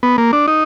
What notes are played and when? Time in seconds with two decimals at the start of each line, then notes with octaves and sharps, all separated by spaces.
0.03 B3
0.18 A#3
0.33 D4
0.48 D#4